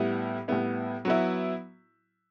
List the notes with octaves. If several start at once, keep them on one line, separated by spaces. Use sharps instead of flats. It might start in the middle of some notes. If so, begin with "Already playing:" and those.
Already playing: A2 G3 B3 E4
A2 G3 B3 E4
F#3 B3 E4